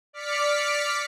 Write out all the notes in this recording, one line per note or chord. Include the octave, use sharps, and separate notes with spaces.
D5 D6 F6 B6 C#7